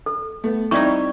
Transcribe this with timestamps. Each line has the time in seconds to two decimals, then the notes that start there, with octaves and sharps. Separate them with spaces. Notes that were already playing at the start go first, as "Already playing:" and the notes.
0.06 A4
0.44 A3 B3
0.71 G3 C4 D#4 E4 D5 C#6